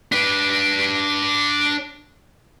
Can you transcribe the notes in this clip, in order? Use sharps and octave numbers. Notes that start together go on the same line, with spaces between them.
D4 B4